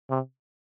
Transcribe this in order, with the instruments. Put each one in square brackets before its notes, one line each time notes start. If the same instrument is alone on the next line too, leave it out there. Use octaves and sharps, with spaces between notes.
[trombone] C3